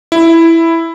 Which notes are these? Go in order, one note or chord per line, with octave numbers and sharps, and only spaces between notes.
E4